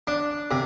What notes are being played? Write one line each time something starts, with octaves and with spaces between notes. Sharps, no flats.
D4
C3